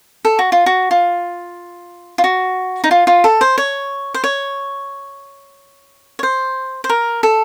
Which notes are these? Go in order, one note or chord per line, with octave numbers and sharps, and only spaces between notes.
A4
F#4
F4
F#4
F4
F4
F#4
D#4
F4
F4
A4
C5
C#5
C5
C#5
C#5
C5
C5
A#4
A4